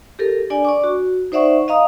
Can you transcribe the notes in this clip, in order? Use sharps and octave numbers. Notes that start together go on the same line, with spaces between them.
G4 A4 A#4
D4 D5 G#5
D5 C#6 D6
F#4
D#4 C5 D5 E5 F#5 C#6
D#5 F5 A#5 D#6